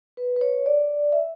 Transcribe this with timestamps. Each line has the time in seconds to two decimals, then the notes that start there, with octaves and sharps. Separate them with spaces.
0.17 B4
0.36 B4
0.41 C#5
0.66 D5
1.12 E5